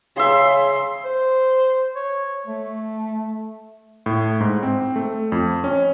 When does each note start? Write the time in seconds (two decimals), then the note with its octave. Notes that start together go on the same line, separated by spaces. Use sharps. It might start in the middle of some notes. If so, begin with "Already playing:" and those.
0.17 C#3 G#4 E5 C6
1.05 C5
1.96 C#5
2.47 A3
4.06 A2
4.40 G#2
4.63 C4
4.96 A3
5.32 F2
5.64 C#4